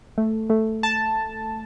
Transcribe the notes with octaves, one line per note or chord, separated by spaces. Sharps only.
A3
A3
A5